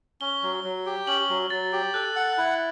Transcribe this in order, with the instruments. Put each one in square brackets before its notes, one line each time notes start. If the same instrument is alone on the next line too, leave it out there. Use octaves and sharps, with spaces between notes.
[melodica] C#4 [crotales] G7
[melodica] F#3
F#3
G4
[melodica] C#4 [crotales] F#7
[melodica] F#3
[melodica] F#3 [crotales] A6
[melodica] G4
[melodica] A4 [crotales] F#6
[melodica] F#5
E4